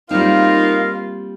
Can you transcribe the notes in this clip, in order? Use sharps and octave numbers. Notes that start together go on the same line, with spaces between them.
G3 A#3 C4 D#4 F4 A#4 F5